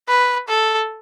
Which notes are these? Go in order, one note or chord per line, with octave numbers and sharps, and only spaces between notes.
B4
A4